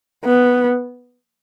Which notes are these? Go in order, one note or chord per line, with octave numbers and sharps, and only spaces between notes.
B3